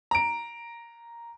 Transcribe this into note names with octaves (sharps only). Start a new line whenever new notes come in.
A#5 D7